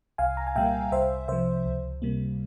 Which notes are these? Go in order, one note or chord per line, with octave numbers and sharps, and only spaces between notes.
C2 F5 G#5
A#5
G#5
A#2 G3 A#3 E5 G5
C2 C5 E5
C3 F3 C5 E5
C#2
C3 G3 A#3